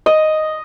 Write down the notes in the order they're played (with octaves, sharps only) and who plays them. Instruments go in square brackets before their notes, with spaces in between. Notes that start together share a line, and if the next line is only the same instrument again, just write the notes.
[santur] D#5